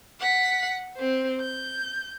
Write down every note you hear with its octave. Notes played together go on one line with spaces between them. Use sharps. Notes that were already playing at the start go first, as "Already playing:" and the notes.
F#5 B6
C4 C5
G6